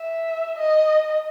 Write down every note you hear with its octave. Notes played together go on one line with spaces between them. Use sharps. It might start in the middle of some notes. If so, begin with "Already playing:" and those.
Already playing: E5
D#5